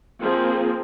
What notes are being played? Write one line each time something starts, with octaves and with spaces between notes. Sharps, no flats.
F3 A#3 C4 G#4